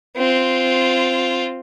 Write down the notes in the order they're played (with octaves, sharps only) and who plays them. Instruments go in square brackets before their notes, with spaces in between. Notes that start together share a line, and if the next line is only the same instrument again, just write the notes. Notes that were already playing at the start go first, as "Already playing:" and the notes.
[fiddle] C4 F4